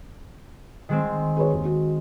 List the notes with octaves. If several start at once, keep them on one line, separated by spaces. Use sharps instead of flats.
D#3 G#3 C4
G#4 B4 C#5
D#2
F#4